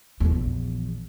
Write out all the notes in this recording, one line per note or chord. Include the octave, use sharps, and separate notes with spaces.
A#1 E2